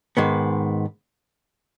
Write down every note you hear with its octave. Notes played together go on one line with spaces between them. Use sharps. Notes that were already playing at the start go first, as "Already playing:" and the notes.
G#2 D#3 G#3 B3